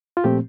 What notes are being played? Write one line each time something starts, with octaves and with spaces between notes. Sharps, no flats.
F4
A#2 F3 A3 C4 G4